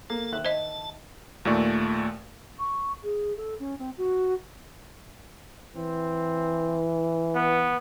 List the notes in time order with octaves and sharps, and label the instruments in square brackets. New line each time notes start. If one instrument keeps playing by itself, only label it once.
[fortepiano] A#3 [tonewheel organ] A4
[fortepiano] D#3 E5 F#6
[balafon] C5 D#5 [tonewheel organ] A5
[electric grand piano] D#2 A#2 A3 D5 C#6
[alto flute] C#6
G#4
A4
C#4
C4
F#4
[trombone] E3 [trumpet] C4
[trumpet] B3